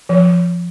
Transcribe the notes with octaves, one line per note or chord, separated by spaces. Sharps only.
F3